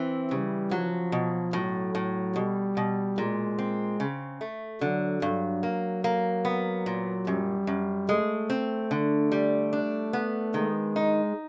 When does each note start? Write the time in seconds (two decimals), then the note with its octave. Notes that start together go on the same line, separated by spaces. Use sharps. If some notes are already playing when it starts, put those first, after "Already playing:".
Already playing: E3 C4
0.31 C#3 G3
0.71 F3 F#3
1.12 B2
1.53 A2 F#3
1.95 A2
2.36 B2 G3
2.77 B2
3.17 A#2 G#3
3.58 C4
4.00 C#3
4.41 A3
4.81 D3 F#3
5.22 G2 F#3
5.63 A#3
6.04 A#3
6.45 B3
6.86 A#2
7.27 F#2 G3
7.67 F#2
8.09 G#3 A3
8.50 C4
8.91 D3
9.32 G3
9.73 D4
10.13 B3
10.54 D#3 G#3
10.96 D#4